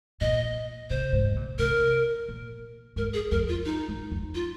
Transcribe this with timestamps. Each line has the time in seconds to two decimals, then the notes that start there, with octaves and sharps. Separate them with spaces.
0.21 A#2 D#5
0.90 C3 C5
1.13 G#2
1.32 C3
1.36 A#2
1.59 C3 A#4
2.28 A#2
2.96 G#2 A#4
3.14 G#4
3.31 F2 A#4
3.49 F4
3.65 D#4
3.88 G#2
4.11 F2
4.35 F4